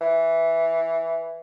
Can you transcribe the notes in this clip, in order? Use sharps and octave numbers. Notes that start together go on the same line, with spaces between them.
E3